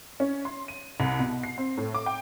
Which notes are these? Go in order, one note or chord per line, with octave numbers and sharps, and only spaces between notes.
C#4
C6
D#7
C2
B2
C7
C4
A2
D6
G5